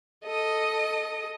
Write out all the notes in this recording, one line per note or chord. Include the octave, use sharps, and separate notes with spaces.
A4 D#5 D#6